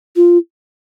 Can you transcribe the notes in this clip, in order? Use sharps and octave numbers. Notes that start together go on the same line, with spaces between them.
F4